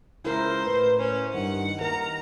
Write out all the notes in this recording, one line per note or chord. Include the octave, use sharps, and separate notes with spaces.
C#2 E4 A#4 C5
A2 B4
C#4 C5
G2 D#3 F#5
D#2 D#3 A#4 A#5